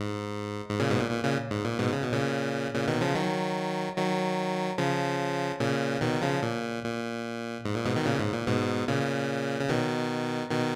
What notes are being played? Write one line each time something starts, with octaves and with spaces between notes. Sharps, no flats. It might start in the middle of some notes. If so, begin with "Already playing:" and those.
Already playing: G#2
G#2
A#2 C#3
G#2 B2
A#2
A#2
A#2 C#3
G#2
A#2
G#2 B2
C#3
B2
A#2 C#3
A#2 C#3
B2 D#3
C#3 F3
D#3 F#3
D#3 F#3
C#3 F3
A#2 C#3
B2 D#3
C#3 F3
A#2
A#2
G#2
A#2
G#2 B2
B2 D#3
A#2 C#3
G#2
A#2
G#2 B2
A#2 C#3
C#3
B2 D#3
B2 D#3